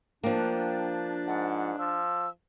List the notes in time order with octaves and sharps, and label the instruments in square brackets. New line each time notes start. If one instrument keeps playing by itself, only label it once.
[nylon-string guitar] F3 A#3 [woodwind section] D4 [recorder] G5
[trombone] G#2 [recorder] F#5
[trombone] F3 [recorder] E6